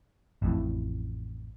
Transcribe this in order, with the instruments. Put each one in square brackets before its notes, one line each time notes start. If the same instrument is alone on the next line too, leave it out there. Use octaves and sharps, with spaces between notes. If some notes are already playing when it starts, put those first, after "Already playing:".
[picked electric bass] A1 F2 A2